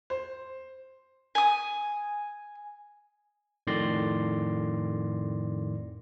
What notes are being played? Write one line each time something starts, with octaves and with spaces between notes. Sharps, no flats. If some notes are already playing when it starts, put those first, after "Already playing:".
C5
G#5 D#6
F2 A2 D#3 D5 C6 A#6